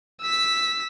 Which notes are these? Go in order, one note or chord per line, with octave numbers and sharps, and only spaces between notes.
E6 B6